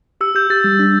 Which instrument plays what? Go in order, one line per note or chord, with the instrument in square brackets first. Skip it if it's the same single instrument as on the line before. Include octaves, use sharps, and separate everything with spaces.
[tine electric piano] G4 [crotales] E6
[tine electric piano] G4 [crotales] G6
[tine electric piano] G4 [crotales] A6
[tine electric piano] G3
D4